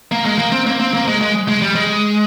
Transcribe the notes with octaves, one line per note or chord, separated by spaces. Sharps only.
A#3
G#3
A#3
C4
A#3
C4
A#3
G#3
G#3
G#3
G3
G#3